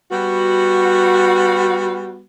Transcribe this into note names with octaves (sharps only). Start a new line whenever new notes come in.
G3 B3 F#4